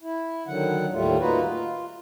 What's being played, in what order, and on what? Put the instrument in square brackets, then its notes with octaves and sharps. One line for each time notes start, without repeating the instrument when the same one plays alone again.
[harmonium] E4
D3 D#3 F#3 F#5
D#2 A2 G3 A3 F4
A#3 D#4 F4 F#4 B4
F4